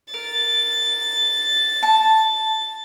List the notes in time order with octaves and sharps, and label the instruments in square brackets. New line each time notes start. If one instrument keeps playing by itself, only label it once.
[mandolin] A#4 [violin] A6
[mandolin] A5